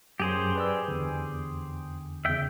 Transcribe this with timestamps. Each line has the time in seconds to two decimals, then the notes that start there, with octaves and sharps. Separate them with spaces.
0.20 F#2 G4 G#4 C5
0.56 B4 D5 E6
0.88 E2 D3
2.25 E2 C#3 E5 G5